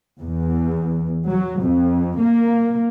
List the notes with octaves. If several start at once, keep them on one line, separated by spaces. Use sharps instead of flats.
E2
F#3
F2
A#3